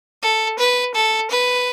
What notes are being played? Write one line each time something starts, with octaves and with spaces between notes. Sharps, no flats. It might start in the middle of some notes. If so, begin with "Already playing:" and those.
A4
B4
A4
B4